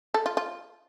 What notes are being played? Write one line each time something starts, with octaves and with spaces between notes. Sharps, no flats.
A4
F4
F4